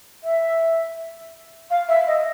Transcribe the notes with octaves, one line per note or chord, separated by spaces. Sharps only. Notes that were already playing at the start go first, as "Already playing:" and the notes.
E5
F5
E5
D#5